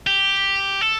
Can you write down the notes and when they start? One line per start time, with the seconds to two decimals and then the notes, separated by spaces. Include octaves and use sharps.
0.07 G4
0.81 A4